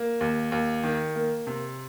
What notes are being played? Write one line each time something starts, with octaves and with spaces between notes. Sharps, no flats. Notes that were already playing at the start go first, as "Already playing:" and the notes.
Already playing: A#3
D#2
D#2
D#3
A#3
C3